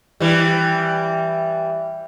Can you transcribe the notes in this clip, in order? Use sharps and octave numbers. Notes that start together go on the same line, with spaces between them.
E3 G3